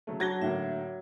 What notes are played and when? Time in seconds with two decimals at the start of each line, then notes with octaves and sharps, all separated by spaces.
0.07 C#3 F#3 A3
0.20 F#3 D4 F#4 A5 G#6 A#6 G7
0.42 A2 D3 A#3 E5